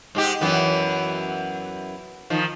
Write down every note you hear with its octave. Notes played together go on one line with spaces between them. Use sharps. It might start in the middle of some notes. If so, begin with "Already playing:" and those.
G#2 G#3 G4
F#2 E3 B3
D#3 F3